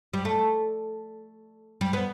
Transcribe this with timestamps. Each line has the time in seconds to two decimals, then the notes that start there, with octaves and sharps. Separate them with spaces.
0.13 G3
0.25 A3
1.81 G3
1.93 B3